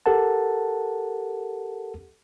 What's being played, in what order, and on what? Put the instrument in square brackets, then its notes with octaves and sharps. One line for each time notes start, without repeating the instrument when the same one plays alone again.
[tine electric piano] G4 A4 A#4 F#5 A5